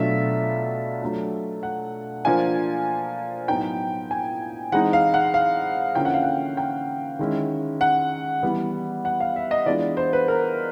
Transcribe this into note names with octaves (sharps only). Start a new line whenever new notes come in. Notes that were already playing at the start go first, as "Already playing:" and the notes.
Already playing: B2 F#3 A3 D4 F4 E5
F#3 A3 D4 F4
F#5
F3 A#3 D4 F4 G#5
A2 F#3 B3 D#4 G5
G#5
E3 G#3 C4 D#4 F#5
F5
F#5
F5
D3 F3 A#3 C#4 E4 G5
F#5
F5
F#5
G5
D#3 G#3 C#4 E4
F#5
E3 G3 B3
F#5
F5
E5
D#5
E3 G#3 B3 D4 F4 D5
C5
B4
A#4